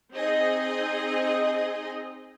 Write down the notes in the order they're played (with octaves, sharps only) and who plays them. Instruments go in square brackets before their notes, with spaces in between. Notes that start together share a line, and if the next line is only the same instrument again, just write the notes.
[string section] C4 D#4 G#4 D#5